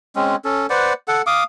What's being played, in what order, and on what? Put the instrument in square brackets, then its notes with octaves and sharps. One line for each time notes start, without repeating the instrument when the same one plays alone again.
[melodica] G#3 C4 C#4
C#4 A4
B4 C5 D5 F#5
A4 F#5
F5 D6 D#6